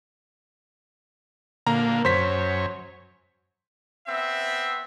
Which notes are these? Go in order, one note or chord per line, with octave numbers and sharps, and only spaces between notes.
A#2 D3 A#3 A#5
F#2 C5 C#5 B6
B3 C4 E5